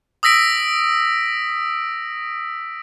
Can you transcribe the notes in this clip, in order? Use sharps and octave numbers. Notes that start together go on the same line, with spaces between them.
D#6 E6 A#6 B6 D7